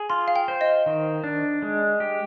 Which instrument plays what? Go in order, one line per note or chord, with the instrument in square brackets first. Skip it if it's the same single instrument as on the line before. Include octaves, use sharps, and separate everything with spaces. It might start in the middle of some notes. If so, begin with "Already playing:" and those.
Already playing: [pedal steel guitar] G#4
[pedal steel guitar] F4 [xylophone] C6
[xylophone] F5
G5
[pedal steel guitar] C5
[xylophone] D#5
[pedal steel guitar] D#3
D4
G#3
G4